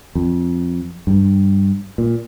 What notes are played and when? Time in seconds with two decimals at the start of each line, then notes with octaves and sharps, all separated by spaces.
0.15 F2
1.07 G2
1.98 A#2